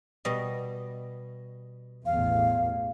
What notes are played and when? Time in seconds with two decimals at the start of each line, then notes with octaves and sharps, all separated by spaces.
0.25 B2 G3 D#5
2.06 A1 E2 F5